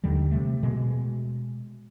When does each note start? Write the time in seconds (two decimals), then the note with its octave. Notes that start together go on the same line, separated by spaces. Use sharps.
0.04 D#2 D3 D#3 G3
0.31 C3 A3
0.63 B2 G#3